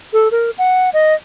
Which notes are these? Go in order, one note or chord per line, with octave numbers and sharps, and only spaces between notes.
A4
A#4
F#5
D#5